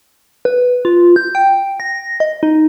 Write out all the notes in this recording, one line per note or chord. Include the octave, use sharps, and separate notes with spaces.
B4
F4
G6
G5
A#6
D#5
D#4